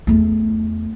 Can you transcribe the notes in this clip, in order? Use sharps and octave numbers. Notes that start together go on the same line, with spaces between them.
E2 A3